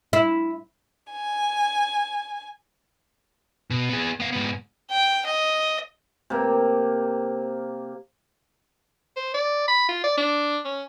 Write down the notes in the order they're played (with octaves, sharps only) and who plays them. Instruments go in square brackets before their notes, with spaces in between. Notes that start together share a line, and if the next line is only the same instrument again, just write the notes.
[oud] E4
[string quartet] G#5
[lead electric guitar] B2
B3 G#4
B3 F5
G#2 B3
[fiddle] G5
D#5
[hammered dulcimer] C3 A#3
[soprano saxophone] C5
D5
B5
F4
D5
D4
C#4